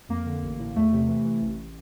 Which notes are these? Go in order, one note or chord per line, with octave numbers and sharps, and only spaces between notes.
F2 A#3
D3
A1
A2
E2 A3
C3
E3
E3
A1